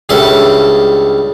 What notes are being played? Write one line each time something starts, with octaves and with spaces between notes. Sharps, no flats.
C#2 G2 C#3 A4 E5